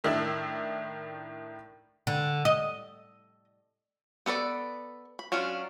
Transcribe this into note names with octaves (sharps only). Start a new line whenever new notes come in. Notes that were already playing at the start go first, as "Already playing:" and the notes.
A2 D#3 D4 E4 E6 F#7
D3
D#5
B3 A4 B4 D5
B5
F#3 C#4 D4 F4